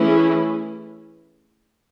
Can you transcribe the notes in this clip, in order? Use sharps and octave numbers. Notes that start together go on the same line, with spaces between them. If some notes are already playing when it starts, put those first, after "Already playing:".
Already playing: E3 A3 C#4 E4 G#4